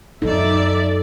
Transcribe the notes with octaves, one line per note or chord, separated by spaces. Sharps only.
F#2 F#3 D#4 A4 D5 E5